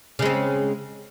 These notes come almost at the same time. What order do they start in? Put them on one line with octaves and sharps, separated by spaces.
C#3 G#3 C4